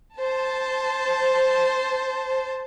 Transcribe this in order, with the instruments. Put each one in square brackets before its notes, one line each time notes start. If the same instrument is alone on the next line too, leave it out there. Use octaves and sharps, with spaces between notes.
[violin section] C5 A5